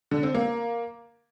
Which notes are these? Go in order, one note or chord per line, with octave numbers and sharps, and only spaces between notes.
D3
C4
A#3